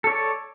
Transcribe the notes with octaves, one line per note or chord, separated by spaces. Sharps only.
A4 C#5 D5